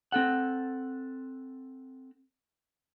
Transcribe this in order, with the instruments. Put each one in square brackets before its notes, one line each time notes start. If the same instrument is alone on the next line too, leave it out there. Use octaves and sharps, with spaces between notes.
[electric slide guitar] C4 A4 F#5